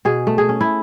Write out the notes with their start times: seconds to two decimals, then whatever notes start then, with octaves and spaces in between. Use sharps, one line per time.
0.05 B2 G#4
0.27 A3
0.38 G#4
0.49 C#4
0.61 E4